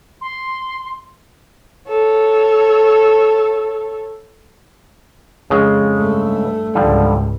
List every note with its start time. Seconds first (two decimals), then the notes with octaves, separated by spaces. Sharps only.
0.21 C6
1.87 A4 C#5
5.50 F2 C#3 G#3
5.96 G2 A3
6.75 C#2 G#2 D3 F3 G3